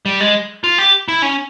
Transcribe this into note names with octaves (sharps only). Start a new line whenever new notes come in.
G3
G#3
F4
G4
E4
C#4